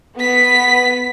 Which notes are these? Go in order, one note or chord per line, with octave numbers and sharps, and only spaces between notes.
B3 B6